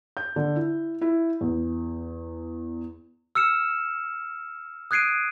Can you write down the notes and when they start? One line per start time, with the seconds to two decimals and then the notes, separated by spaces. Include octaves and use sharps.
0.17 G6
0.36 D3
0.56 E4
1.01 E4
1.41 E2
3.35 E6 F6 C#7 E7
4.91 D#6 F#6 G#6 C7 D7 D#7